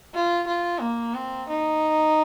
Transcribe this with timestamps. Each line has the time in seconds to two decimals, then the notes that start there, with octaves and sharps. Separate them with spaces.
0.14 F4
0.47 F4
0.81 A#3
1.14 C4
1.48 D#4